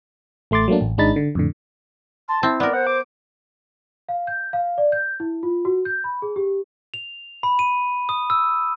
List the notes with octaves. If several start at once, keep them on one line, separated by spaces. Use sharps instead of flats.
A1 A3 C6 D6 A6
F#3 A3 A#3 D4
A1
G#1 G#3 D4 D#4 B5 A6
D3
F2 A2 D3
A5 C6
C4 E4
B3 A#4 D5
C5 F#5
D6
F5
G6
F5
D5
G6
E4
F4
F#4
G6
B5
G#4
G4
F7
B5
D#7
D#6
E6